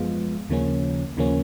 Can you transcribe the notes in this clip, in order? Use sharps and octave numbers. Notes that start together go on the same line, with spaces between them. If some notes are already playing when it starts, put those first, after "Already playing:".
Already playing: F#2 F3 G#3 B3 F4
D#2 C#3 F3 A#3 C#4
D#2 C#3 F3 A#3 C#4